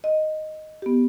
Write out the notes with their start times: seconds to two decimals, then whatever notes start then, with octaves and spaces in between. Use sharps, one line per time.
0.04 D#5
0.82 B3 G4